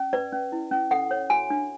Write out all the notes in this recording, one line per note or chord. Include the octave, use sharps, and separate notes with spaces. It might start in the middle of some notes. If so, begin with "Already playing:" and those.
Already playing: C#4
B4 D5
C#4
E4
C#4
A4 F#5
C#5
F#4 G#5
D4